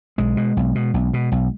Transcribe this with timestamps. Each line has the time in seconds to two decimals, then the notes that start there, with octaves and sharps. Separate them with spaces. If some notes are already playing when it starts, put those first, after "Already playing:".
0.18 B1 G#3
0.37 B2
0.57 B1
0.75 B2
0.94 B1
1.13 B2
1.32 B1